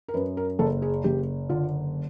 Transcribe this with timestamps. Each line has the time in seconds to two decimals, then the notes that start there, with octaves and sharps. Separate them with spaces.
0.08 A#4
0.14 F#2 B4
0.37 A#4
0.59 F#1 A4
0.82 G#4
1.04 F#1 G4
1.49 D3 F4